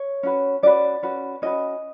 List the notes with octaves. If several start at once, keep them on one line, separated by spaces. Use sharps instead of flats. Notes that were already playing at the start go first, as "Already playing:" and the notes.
Already playing: C#5
C#4 F#4 B4
C#4 F#4 B4 D5
C#4 F#4 B4
C#4 F#4 B4 D#5